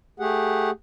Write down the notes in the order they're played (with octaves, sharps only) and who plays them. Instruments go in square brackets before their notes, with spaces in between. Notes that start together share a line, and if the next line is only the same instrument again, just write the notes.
[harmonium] A3 G4 G#4 F#5